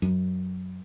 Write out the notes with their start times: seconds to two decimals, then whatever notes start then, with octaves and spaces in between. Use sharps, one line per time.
0.02 F#2